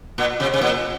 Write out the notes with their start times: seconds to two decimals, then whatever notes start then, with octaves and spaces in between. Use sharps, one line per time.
0.18 A#2
0.40 C3
0.54 C3
0.61 A#2